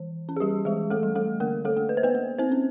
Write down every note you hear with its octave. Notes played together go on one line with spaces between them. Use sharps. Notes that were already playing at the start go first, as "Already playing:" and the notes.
Already playing: E3
C#4
G#4
G3 G4
E3 G#3 G#4
A3 A4
G3
A3 A4
D3 A#3 A#4
A3 A4
A#3
B4
C5
B3 B4
A#3
C4 C5
C#4